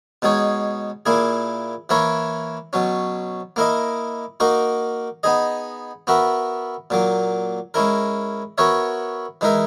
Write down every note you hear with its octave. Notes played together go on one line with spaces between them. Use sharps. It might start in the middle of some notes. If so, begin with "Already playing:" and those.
B2 G#3 D#4 G#4 C#5
A#2 A#3 E4 G#4
E3 A#3 E4 A#4 C#5
B2 F#3 C#4
A#3 E4 A#4 D#5
A#3 D#4 F#4 A#4
B3 D#4 G#4 D#5
B3 F#4 A#4 E5
A#2 F#3 A#3
G#3 C#4 E4 A#4
B3 F#4 A#4 C#5 E5
E3 G#3 D#4 A#4 E5